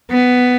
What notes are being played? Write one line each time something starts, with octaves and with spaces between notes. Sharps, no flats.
B3